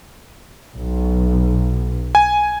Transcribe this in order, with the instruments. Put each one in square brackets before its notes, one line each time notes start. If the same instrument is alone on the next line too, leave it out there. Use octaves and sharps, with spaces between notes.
[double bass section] B1
[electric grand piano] G#5